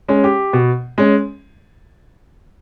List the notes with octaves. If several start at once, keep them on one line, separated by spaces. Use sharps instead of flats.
G#3 C#4
G4
B2
G#3 C#4